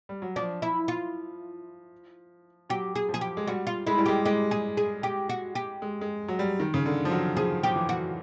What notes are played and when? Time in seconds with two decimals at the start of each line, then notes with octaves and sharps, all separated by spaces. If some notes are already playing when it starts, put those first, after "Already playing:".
0.09 G3
0.22 F#3
0.36 F3 D4
0.62 E4
0.88 F4
2.69 F#3 G4
2.95 G#4
3.09 F3
3.14 G#4
3.21 G4
3.37 G#3
3.47 G3 F#4
3.67 F4
3.87 G#3 E4
3.98 G3
4.06 G#3 G4
4.25 G#3 G4
4.51 G#4
4.77 G#4
5.03 G4
5.29 F#4
5.55 G4
5.82 G#3
6.01 G#3
6.28 F#3
6.39 G3
6.60 D#3
6.74 C#3
6.86 D3
7.05 F3
7.11 F#3
7.37 F3 G#4
7.63 F3 G4
7.76 E3
7.89 F#4